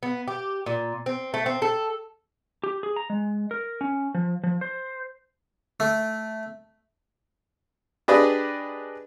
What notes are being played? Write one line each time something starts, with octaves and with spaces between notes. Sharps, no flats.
B3
G4
A#2
C4
A3
C4
A4
G4
G#4
A#5
G#3
A#4
C#4
F3
F3
C5
A3
D4 G4 G#4 B4 D5 D#5